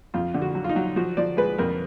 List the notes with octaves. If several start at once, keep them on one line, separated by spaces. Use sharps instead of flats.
F2 F4
D3
F#4
F#3
F4
D#4
F#3
F3 F#4
F3 D5
G#3 B4
F2 A#4